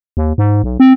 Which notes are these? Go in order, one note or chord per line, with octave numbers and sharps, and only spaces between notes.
D#2
G#2
B1
C4